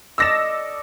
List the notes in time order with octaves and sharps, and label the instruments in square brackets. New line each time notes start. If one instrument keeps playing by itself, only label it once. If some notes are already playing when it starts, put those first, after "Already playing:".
[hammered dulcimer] A4 D5 D#5 [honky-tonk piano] E6 A#6 E7